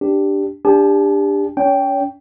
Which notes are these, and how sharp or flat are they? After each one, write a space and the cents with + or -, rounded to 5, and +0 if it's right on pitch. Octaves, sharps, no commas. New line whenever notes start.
D4 +0 G4 +0
D4 +0 G4 +25 A5 -35
C#4 +40 C#5 +30 G5 +0